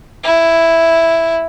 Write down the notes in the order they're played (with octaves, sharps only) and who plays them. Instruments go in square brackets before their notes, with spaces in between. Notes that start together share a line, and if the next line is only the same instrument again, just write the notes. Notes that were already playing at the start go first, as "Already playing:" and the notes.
[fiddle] E4